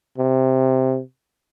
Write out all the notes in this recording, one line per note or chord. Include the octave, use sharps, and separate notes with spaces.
C3